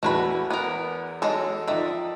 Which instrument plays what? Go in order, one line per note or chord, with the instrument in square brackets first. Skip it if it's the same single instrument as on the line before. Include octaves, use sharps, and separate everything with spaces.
[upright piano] E2 E3 [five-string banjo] A3 F#4 B5
[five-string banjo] B3 A#4
F#3 G#3 A4
[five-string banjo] D#3 E5 [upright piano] F3 D5